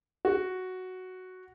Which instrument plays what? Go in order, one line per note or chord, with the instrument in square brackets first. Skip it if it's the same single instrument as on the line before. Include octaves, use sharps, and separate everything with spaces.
[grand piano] F#4